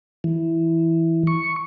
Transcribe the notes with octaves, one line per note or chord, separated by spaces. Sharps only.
E3
C#6